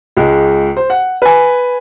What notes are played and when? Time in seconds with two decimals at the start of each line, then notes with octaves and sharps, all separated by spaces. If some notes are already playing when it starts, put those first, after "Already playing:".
0.17 C#2 G#3
0.77 C5
0.90 F#5
1.22 B4 G#5